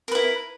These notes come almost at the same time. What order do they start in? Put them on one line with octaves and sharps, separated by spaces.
A#4 B4 E4